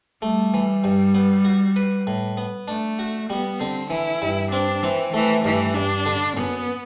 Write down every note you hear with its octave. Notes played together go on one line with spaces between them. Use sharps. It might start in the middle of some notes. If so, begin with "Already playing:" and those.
G3 A3
E3
G2
B3
F#4
B4
A2
B3
A3 D4
F#4
G3 B3
D3 C4
E3 E4
G2
C4 D4
E3 C4
E3 A3
G2 E3
G2 D4
D3
F#2 B3